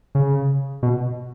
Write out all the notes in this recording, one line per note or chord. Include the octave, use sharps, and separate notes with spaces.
C#3
B2